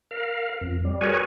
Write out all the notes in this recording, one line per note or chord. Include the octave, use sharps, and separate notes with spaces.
A#4 F5
F2
G3
F#4 G#4 A#4 B4 C#5 G#5